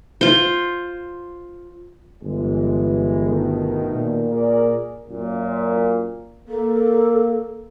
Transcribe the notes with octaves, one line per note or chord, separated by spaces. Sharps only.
F4 C5
G1 E3 G#3
B2 D#3 A3
A#2
G#4 A#4 D5
F#2 A#2
A#3 A4